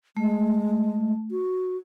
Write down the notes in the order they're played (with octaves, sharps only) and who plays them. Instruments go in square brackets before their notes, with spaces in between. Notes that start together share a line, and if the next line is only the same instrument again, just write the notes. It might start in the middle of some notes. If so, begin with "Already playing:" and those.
[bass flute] G#3 [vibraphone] A3
[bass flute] F#4